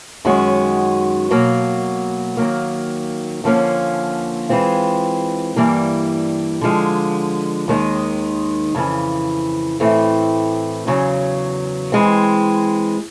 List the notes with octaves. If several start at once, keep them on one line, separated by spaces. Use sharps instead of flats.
F#2 D#3 G#3 C#4 F#4
B2 F#3 A#3
D#3 F#3 A#3
D3 F3 A#3 C#4
E3 G#3 C4 F4
G2 E3 G3 A#3
D3 F3 G#3
D#2 D#3 G#3 B3 D#4
F2 C#3 E3
A2 E3 A3 C4
E2 C#3 F#3
E3 G#3 C4